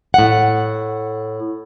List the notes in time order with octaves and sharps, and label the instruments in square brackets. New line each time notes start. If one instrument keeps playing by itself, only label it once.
[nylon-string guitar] A2 F#5